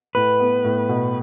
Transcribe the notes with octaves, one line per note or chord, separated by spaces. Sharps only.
A2 B4
B3
A2
B2